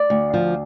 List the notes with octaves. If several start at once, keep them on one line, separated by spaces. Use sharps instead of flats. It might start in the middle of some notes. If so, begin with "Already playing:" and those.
Already playing: D5
D2
F3